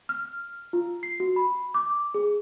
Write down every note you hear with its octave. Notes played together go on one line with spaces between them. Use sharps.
F6
F4
C7
F#4
B5
D6
G#4